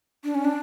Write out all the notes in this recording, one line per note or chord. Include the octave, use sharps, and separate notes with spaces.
D4
C#4
D4